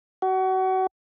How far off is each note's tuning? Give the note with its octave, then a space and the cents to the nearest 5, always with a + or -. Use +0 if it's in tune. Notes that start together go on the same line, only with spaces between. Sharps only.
F#4 +30